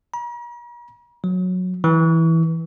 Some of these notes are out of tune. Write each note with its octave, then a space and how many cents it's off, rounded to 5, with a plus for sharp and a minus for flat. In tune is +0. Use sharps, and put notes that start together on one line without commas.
A#5 +45
F#3 -15
E3 -10